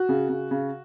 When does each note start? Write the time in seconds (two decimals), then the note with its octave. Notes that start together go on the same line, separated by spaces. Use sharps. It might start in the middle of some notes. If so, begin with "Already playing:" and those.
Already playing: F#4
0.09 C#3
0.29 C#3
0.51 C#3